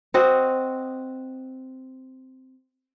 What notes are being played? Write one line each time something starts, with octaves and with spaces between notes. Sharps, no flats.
C4 F#4 D#5